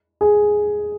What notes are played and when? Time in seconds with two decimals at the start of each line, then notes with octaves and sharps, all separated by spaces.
0.21 G#4